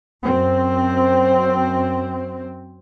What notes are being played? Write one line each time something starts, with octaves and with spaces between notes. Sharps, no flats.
F#2 C4